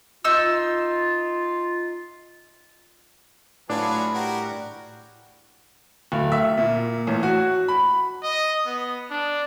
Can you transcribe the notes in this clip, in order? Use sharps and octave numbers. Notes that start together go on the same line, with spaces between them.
D#4 F4 E6
A2 F#3 D4 F4 G#4 B4
G3 F#4 G4 A#4
D1
E5
A#2
A1
F#4
B5
D#5
B3
D4